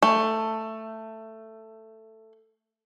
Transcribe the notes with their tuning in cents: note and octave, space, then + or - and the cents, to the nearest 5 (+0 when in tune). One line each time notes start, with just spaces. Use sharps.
A3 +10